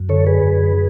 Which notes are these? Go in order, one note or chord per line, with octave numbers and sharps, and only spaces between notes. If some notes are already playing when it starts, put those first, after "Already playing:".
Already playing: F#2
D3 A4 C#5
G#4 B4
F#2